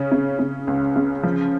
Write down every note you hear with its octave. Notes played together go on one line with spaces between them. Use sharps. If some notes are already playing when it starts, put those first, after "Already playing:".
Already playing: C#3 C#4
C#3
C#3
C#2
C#3
F3